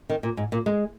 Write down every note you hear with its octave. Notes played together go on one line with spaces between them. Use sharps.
D#3
A#2
G#2
A#2
G#3